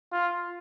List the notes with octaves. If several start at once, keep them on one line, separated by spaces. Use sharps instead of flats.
F4